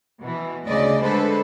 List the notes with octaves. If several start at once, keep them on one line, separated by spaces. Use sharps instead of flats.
B2 E3
D2 C#3 D5 D#5
D3 G#3 A4 B4 C5